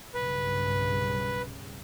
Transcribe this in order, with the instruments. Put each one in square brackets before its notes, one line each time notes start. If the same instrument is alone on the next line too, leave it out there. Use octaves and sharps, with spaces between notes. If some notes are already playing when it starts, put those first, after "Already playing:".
[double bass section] B1 G2 C#3 [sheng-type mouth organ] B4